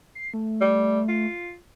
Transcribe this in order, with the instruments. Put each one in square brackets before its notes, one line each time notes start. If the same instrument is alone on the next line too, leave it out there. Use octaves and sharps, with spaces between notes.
[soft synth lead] C7
A3
[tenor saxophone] G3
F4